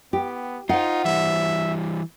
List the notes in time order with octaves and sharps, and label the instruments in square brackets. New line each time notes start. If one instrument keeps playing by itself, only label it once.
[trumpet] B3 [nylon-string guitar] G4
[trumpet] D#4 [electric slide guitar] F4 [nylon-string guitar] C5 F#5
[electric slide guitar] E3 G3 [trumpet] E5